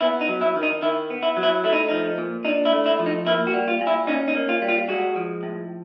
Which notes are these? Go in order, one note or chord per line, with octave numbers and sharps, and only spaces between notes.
B3 E4
D#4
F#3
E4
D#3
D#4
D#3 E4
B3
E4
F#3
E4
A3 E4
D#4
F3 D#4
A#2
D4 D#4
E4
A3
E4
F3
D#4
A#3 E4
F#4
G3
F4
A#2
E4
C#4 D#4
D#4
A#3
F4
G3
F4
G#3 F#4
F3
A2